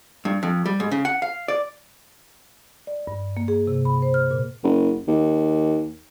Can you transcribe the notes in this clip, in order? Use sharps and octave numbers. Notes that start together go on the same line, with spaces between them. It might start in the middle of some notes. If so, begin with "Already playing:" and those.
G2
F2
G3
G#2
C#3
F#5
F5
D5
D5
G2
A#3
G#4
C3
B5
C5
F6
A#2
F#1
D#2